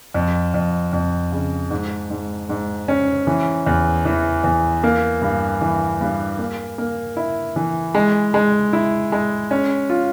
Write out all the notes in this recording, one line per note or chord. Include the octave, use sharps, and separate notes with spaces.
F2
F2
F2
C#3
G#2
G#2
G#2
C#4
E3
E2
E3
E2
A#3
G2
E3
G2
A#3
A#3
E4
E3
G#3
G#3
E4
G#3
C#4
F4